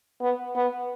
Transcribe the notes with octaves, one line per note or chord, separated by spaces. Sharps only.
B3
B3